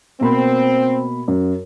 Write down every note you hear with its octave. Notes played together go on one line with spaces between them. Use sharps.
B2 A#3 C4 B5
F#2